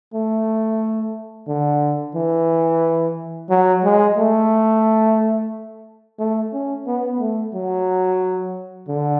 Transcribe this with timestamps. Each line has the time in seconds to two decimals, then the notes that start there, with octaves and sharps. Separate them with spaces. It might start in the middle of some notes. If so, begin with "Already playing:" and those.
0.14 A3
1.48 D3
2.15 E3
3.50 F#3
3.84 G#3
4.17 A3
6.19 A3
6.54 C#4
6.87 B3
7.20 A3
7.54 F#3
8.89 D3